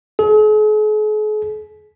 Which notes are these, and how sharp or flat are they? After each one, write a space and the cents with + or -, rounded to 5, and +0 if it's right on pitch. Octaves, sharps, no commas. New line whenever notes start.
G#4 +45